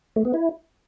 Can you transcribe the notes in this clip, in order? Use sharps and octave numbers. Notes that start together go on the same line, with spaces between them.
A3
B3
E4